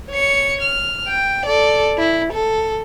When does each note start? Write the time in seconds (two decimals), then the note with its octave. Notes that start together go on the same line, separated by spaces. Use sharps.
0.10 C#5 C#7
0.62 F6
1.08 G5
1.46 A4 D5
1.98 E4
2.33 A4